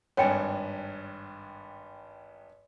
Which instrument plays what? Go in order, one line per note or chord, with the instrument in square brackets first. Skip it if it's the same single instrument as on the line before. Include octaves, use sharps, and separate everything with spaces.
[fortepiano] G#1 G2 [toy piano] C#5 G5 G#5